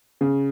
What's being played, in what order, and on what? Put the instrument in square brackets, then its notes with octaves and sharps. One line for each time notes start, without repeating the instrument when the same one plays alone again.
[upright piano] C#3